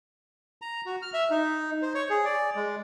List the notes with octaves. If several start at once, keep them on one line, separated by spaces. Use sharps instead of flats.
A#5
F#4
F6
E5
D#4
C5
C#5
G#4
D5
G#3